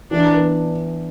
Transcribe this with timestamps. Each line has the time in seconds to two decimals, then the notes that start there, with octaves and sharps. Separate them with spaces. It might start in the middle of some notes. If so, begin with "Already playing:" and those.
0.11 E3 D4
0.33 B3